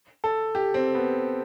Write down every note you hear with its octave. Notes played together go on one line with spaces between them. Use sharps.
A4
G4
C4
B3